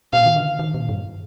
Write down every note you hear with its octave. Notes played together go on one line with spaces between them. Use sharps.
A#2 F5
D#3
D3
D#3
A#2
G2